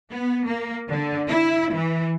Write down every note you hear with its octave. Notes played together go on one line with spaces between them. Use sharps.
B3
A#3
D3
E4
E3